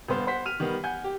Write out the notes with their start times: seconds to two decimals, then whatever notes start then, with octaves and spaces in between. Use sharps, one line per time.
0.08 D#1 G2 B3 C5
0.27 C5 F#5 B6
0.46 F6 D#7 F7
0.60 D#3 G3 B3
0.84 F#5 G#5 G6
1.04 G4